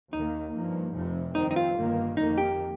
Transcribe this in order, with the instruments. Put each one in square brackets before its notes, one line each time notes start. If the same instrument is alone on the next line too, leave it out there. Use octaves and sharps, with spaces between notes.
[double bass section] D#2 D#3 A#3 [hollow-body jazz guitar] D#4
[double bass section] G2 F3 A#3
F1 F2 C3 F3
[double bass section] G2 D#3 C4 [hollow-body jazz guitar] D#4
[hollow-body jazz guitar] D#4
F4
[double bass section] G1 G2 D#3 A#3
[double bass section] F2 D#3 A#3 [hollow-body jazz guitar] D#4
[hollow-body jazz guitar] G4